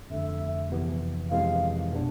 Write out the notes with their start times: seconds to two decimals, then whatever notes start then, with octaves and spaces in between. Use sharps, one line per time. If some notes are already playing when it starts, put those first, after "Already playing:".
0.10 F2 D3 A3 E5
0.70 F2 C3 E3 B3
1.31 F2 C3 E3 G#3 F5
1.92 B2 B3 D4